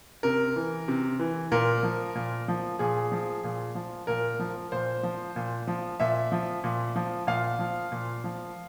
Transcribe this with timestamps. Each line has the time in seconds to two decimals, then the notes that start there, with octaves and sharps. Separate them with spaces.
0.23 C3 A#4
0.56 E3
0.88 C3
1.19 E3
1.52 A#2 A#4
1.83 F3
2.15 A#2
2.48 F3
2.79 A#2 G#4
3.12 F3
3.44 A#2
3.75 F3
4.07 A#2 A#4
4.40 F3
4.72 A#2 C5
5.03 F3
5.36 A#2
5.68 F3
6.00 A#2 E5
6.32 F3
6.64 A#2
6.96 F3
7.27 A#2 F5
7.59 F3
7.92 A#2
8.24 F3